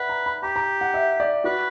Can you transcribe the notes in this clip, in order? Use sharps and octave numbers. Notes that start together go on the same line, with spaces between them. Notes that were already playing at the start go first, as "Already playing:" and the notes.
Already playing: B4 D5 E5 F#5
A#5
B5
G4 A#5
A#5
F#5
E5
D5
F#4 B4